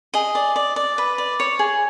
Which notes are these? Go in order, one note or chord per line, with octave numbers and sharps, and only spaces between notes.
G#4 D#5
D5
D5
D5
B4
D5
C#5
G#4